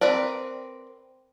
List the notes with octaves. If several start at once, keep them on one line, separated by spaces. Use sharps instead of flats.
C4 A#4 B4 D5